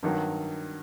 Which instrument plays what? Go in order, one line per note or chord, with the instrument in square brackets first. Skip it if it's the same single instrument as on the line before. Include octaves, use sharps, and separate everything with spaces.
[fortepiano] G2 D#3 F#3